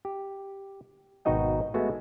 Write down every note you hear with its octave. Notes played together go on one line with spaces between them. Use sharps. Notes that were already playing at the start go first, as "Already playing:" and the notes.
G4
G#1 B2 D#4 F#4 D#5 G5
G#3 A3 B3 F#4